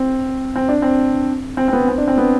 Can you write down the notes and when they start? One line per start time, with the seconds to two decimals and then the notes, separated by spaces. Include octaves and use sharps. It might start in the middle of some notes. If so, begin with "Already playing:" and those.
Already playing: C4
0.56 C4
0.68 D4
0.82 C4
1.57 C4
1.68 C4
1.73 B3
1.88 C4
1.98 D4
2.08 C4
2.18 B3